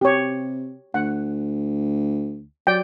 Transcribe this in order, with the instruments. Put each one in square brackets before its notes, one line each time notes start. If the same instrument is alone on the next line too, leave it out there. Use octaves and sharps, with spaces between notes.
[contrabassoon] C3 [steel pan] G4 C#5
[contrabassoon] D2 [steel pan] F#5
[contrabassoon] F#3 [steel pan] D5 G5